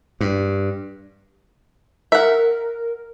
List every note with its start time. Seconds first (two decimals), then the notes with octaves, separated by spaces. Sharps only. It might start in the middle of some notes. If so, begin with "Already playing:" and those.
0.21 G2
2.12 A#4 E5 F#5